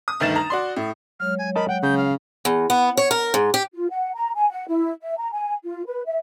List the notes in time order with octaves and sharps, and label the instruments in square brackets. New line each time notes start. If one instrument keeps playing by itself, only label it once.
[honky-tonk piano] D#6
G1 D2 D#3 D#4 A6 E7
A#5
F#4 D5 C6
A2
[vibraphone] F#3 G#3 C#5 [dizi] F6
[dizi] G#5
[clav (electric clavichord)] A#4 D#5 A5 [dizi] B5
[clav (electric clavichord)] F#5 [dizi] G5
[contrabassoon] C#3 [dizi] G6
[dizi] F5
[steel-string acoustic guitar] E2
B3
C#5
A#4
G#2
G4
[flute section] F4
F#5
A#5
G#5
F#5
E4
E5
A#5
G#5
F4
B4
E5